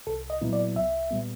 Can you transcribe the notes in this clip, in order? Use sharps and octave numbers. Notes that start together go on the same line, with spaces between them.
C2 A4
D#5
A#2 F#3 B3 E4
D5
C2 E5
A#2 G3 B3